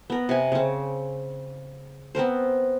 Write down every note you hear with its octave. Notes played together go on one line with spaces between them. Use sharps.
B3 A#4
C3 G#5
C#3 C4
B3 C4 A#4 C5